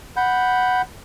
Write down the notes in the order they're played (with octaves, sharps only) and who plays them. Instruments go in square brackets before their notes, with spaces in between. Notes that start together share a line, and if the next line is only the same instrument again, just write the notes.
[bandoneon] F#5 B5 G6